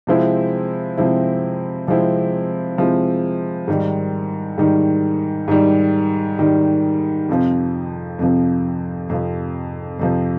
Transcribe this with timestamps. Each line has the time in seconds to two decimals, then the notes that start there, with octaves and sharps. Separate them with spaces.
0.07 C3 F3 G#3 C4 E4
0.97 C3 F3 G#3 C4 E4
1.87 C3 F3 G#3 C4 E4
2.78 C3 F3 G#3 C4 E4
3.68 G#2 D#3 G3
4.58 G#2 D#3 G3
5.48 G#2 D#3 G3
6.39 G#2 D#3 G3
7.29 F2 C3 F3
8.19 F2 C3 F3
9.09 F2 C3 F3
9.99 F2 C3 F3